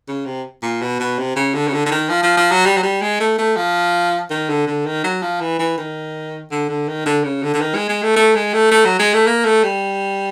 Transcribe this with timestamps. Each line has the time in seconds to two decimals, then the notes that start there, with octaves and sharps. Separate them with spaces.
0.08 C#3
0.26 C3
0.63 A#2
0.82 B2
1.00 B2
1.19 C3
1.36 C#3
1.54 D3
1.68 C#3
1.74 D3
1.86 D3
1.91 D#3
2.10 F3
2.23 F3
2.37 F3
2.52 F#3
2.66 G3
2.77 F#3
2.83 G3
3.02 G#3
3.20 A3
3.39 A3
3.57 F3
4.31 D#3
4.49 D3
4.67 D3
4.86 D#3
5.04 F#3
5.22 F3
5.41 E3
5.59 E3
5.78 D#3
6.52 D3
6.69 D3
6.88 D#3
7.06 D3
7.24 C#3
7.43 D3
7.54 D3
7.61 D#3
7.75 G#3
7.89 G#3
8.03 A3
8.16 A3
8.35 G#3
8.54 A3
8.71 A3
8.85 F#3
8.99 G#3
9.14 A3
9.27 A#3
9.45 A3
9.64 G3